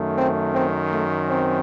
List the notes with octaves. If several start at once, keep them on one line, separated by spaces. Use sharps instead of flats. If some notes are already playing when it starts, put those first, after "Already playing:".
Already playing: F#2 D#3 A3
C4
C4
A3
C4